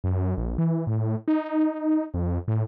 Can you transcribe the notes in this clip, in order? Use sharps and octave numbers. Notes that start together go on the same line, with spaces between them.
F#2
A#1
E3
A2
D#4
F2
A2